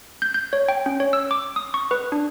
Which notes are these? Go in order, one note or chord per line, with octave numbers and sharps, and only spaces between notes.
G6
G6
C#5
G5
C#4
C#5
E6
D6
D#6
C#6
B4
D4